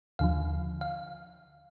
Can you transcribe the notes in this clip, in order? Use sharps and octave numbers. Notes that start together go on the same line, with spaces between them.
D#2 D3 F3 F5
F5